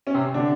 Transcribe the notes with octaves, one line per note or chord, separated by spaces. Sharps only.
C#4
C3 C4
D3 D4